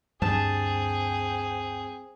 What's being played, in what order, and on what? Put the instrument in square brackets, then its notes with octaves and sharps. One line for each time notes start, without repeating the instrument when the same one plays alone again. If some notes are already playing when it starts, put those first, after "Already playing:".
[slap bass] D2 G2 G3 [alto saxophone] C4 [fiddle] G#4 [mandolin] A5